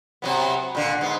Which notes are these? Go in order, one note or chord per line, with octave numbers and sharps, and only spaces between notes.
C3 F#3 B3
A#2 D3
G#2 B3